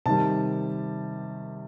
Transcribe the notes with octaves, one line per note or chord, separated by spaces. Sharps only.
C3 D#3 G3 A5